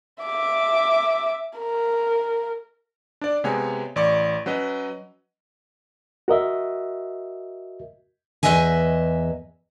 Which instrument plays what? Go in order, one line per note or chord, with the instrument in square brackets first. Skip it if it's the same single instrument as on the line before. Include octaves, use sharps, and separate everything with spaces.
[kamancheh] E5 D6
A#4
[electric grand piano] D4 D5
C3 G#3 B3 C#5 G#5
A1 D5 C#6
F#3 C#4 B4 D#5
[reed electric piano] F#4 A#4 D#5 E5
[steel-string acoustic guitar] E2 G2 B4 D#5 E5 G#5